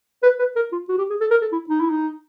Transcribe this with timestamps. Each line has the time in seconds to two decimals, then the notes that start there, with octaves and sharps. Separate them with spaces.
0.23 B4
0.39 B4
0.56 A#4
0.72 F4
0.89 F#4
0.98 G4
1.10 G#4
1.21 A4
1.31 A#4
1.42 A4
1.52 E4
1.69 D#4
1.81 E4
1.90 D#4